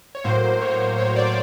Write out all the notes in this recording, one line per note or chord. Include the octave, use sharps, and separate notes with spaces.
C#5
A2 F#3 A#3 C5
C#5
C#5
D5